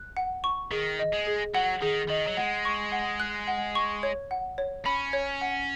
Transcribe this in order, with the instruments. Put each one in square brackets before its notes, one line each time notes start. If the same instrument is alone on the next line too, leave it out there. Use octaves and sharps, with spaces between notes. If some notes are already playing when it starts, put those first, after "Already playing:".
Already playing: [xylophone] F#6
F#5
C#6
[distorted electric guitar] D#3 [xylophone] G#4
[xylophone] D#5
[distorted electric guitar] G#3
[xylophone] G#4
[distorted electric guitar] F#3 [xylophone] F#5
[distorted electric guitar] D#3 [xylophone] G#4
[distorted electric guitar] D#3 [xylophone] D#5
[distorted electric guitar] F#3
[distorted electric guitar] G#3 [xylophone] F#5
[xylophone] C#6
F#5
F#6
F#5
C#6
C#5
F#5
C#5
[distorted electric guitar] C#4 [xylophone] B5
[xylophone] C#5
F#5